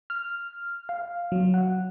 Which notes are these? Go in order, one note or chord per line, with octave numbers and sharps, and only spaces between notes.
F6
F5
F#3
F#5